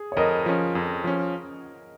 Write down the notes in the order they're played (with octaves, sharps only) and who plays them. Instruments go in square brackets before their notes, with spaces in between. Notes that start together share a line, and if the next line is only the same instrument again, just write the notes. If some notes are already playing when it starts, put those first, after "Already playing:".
Already playing: [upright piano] G#4
C#5
[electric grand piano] F2 [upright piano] A#4 D#5
[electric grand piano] F3 C#4
F2
F3 C#4